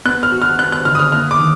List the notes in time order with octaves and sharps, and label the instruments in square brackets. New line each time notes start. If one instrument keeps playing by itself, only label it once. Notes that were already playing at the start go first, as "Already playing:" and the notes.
[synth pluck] B3 [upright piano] F#6
[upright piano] F6
[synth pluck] F#4
[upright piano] F6
[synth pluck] B3 [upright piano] F#6
[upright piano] F#6
[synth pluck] D3 [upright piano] F6
[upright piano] D#6
F6
[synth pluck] A#3 [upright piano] F6
[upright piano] D6
[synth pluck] D#3